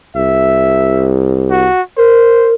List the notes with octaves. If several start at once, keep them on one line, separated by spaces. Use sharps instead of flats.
C2 E5
F#4
A#4 C5